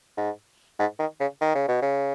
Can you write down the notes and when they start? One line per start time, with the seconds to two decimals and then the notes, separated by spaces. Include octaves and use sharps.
0.17 G#2
0.79 G#2
0.99 D#3
1.20 C#3
1.41 D#3
1.55 C#3
1.69 B2
1.82 C#3